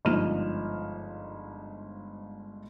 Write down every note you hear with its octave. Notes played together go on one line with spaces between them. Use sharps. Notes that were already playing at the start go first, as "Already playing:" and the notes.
G1 G#2 F3 D#4 F6 E7